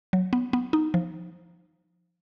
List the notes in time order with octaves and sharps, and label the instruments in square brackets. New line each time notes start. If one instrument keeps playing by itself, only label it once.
[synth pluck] F#3
B3
B3
D#4
F3